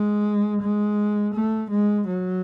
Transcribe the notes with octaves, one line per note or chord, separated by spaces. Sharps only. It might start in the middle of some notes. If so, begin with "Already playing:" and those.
Already playing: G#3
G#3
A3
G#3
F#3